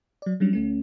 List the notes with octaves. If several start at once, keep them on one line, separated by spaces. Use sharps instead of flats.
F#3 D5
F#3 G3 C#4 D4
D2 A3 C#4